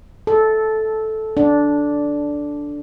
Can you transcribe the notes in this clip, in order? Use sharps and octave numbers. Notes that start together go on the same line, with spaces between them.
A4
D4